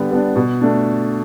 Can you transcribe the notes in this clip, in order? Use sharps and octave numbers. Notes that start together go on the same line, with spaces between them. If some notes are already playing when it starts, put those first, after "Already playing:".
Already playing: D3 G3 B3 D4
G3 B3 D4
B2
A3 D4